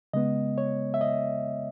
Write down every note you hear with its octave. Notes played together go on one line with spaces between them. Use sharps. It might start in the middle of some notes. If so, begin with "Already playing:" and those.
C#3 G#3 B3 D#5
C#5
E5
D#5